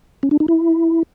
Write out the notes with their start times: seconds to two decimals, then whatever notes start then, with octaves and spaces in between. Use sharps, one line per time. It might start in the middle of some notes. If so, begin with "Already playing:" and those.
0.23 C#4
0.31 D4
0.40 D#4
0.48 E4